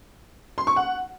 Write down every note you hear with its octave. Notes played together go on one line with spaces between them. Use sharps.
C6
C#6
F#5